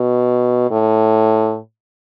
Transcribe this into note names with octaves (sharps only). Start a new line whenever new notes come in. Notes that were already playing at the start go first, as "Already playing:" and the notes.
Already playing: B2
A2